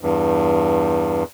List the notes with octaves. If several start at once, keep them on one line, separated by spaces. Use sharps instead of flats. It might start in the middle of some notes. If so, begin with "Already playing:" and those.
E2 G2